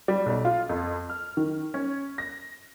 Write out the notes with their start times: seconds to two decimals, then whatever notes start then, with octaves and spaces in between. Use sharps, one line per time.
0.08 G3
0.26 B1
0.45 F4
0.69 F2
1.10 F6
1.37 D#3
1.74 C#4
2.18 A#6